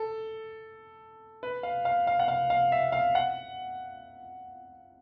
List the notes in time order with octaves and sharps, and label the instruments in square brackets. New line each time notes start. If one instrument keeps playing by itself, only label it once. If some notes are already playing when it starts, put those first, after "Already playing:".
Already playing: [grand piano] A4
B4
F5
F5
F5
F#5
F5
F5
E5
F5
F#5